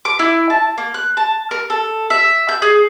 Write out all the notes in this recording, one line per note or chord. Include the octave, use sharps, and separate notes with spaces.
D6
E4
A5
A#3
F#6
A5
A#4
A4
E5
G6
G#4